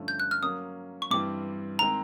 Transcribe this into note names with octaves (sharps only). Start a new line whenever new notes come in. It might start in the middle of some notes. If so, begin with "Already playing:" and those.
Already playing: G2 D3 F3 A3 C#4
G6
F#6
F6
F#3 A#3 C#4 D#6
C#6
G2 E3 G3 C4 D6
D#3 G#3 C4 A#5